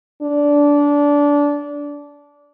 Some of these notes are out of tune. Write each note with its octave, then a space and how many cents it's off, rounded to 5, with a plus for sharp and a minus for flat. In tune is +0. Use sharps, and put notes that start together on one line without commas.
D4 -20